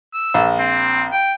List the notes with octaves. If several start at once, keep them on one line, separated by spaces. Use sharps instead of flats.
E6
A#1
C4
G5